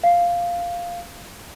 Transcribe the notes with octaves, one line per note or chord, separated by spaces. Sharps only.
F5